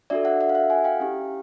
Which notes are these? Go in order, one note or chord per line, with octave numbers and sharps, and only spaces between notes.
D4 F#4 A4 D5 E5
E5 F#5
E5 F#5
F5
E5 F#5
F#5 G#5
F5 G5
C#4 E4 G4